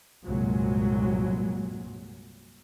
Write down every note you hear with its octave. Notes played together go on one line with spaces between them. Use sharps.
C2 G2 A#2 F#3 G#3